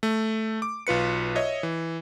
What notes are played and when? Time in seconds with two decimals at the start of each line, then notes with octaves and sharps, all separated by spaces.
0.03 A3
0.62 D6
0.87 B1 F4 B4 C#7
1.36 C#5 D#5 E5
1.63 E3